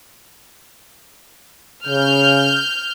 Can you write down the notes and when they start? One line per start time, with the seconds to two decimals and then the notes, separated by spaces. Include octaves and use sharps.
1.87 C#3 F6 G6